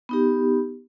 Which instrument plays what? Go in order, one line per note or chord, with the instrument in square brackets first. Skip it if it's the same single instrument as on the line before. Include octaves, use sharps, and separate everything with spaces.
[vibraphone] B3 D#4 G4